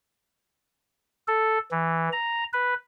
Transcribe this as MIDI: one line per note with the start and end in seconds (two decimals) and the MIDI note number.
1.28 1.59 69
1.71 2.09 52
2.13 2.44 82
2.53 2.74 71